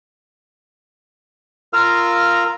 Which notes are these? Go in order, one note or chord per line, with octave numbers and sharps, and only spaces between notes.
F4 A#4 F5 A#5 E6